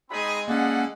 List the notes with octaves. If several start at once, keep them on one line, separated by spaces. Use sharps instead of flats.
G#3 C4 D#4 G#4 B5
A#3 C#4 G#4 A4 D5 F#5